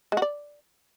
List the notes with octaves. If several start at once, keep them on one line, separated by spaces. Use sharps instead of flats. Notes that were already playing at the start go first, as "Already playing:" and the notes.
G#3
F#4
D5